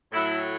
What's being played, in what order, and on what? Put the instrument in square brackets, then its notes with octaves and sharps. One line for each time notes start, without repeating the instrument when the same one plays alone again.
[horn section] A2 F#3 E4